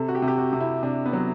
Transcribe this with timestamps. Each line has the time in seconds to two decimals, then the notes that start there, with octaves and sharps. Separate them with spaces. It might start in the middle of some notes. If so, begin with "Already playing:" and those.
Already playing: C3 A4
0.08 F#4
0.15 G4
0.22 C3
0.28 G4
0.38 F#4
0.53 C3
0.60 E4
0.83 C3 D4
1.05 B3
1.13 F#3